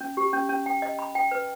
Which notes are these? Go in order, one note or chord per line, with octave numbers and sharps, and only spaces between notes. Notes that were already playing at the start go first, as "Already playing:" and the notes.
C#4
G4
C#4
C#4
G5
D#5
B5
G5
B4